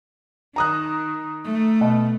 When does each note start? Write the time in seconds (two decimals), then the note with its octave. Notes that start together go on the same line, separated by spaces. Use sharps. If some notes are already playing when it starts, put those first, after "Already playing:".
0.56 D#3 A#5 D#6 F#6
1.45 A3
1.81 B2